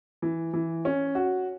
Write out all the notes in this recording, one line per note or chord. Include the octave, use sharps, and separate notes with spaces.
E3
E3
C#4
F#4